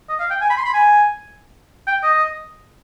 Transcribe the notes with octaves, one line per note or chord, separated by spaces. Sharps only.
D#5
F5
G5
G#5
B5
C6
B5
G#5
G5
D#5